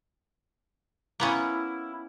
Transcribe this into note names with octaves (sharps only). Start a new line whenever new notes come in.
A#3 B3 C#4 E4